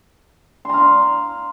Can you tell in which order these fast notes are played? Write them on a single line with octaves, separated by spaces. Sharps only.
C6 A#5 F5